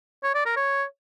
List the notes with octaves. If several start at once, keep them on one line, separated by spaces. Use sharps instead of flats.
C#5
D5
A#4
C#5